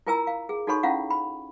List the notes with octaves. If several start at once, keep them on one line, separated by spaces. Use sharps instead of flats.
E4 F4 A#4 G#5 A#5 E6
F5
G#4
D#4 F#4 A4 C#5 B5 C#6
C#4 E4 F4 F5 F#5
B5